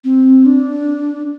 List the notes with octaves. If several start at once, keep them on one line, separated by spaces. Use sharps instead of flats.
C4
D4